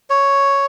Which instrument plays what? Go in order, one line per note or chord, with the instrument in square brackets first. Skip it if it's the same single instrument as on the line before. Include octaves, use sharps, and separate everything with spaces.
[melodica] C#5